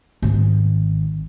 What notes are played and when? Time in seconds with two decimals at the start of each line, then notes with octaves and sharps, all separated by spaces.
0.22 G#1 D#3